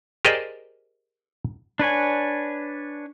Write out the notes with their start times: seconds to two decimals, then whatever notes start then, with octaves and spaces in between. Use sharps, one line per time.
0.25 G4 G#4 A#4 C5 D5 D#5
1.79 D4 B4 C#5 G#5